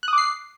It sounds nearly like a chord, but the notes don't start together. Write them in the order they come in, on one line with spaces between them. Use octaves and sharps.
F#6 D#6 D6 C7